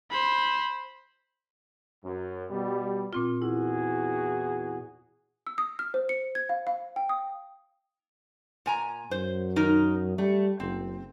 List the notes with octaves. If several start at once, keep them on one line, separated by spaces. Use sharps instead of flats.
C5 B5
F#2
B2 G3
A#2 C4 F4
E2 E4 F#4 G#4
E6
D#6
F6
C5
C#7
G#6
F5
F5
G5
D#6
A#2 G#5 A#5
F#2 C5
D#3 D#4 A#4
G3 A3
F#1 C4